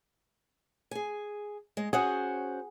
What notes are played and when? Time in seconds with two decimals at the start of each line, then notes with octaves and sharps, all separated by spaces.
0.91 G#4 G#5
1.77 G#3 D#5
1.93 C#4 F#4 G#4 C5 F#5